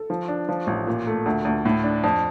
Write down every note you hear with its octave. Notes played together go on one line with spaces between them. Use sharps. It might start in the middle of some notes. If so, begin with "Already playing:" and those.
Already playing: A4
F3
D4
F3
A1
A#2
A3
D2
D2
A2
D4
F2